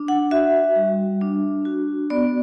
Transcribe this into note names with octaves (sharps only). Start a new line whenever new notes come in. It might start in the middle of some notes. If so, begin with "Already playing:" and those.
Already playing: D4
F#5
F#4 E5
G3
D4
F#4
B3 D5